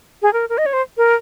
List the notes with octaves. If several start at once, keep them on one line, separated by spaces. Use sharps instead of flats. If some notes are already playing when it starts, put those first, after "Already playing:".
G#4
A#4
A#4
D#5
C#5
C5
A#4